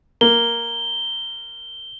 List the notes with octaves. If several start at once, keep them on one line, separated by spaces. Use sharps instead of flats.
A#3 G7